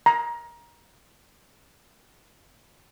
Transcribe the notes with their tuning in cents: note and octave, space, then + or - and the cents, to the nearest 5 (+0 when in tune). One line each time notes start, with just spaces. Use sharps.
A#5 +20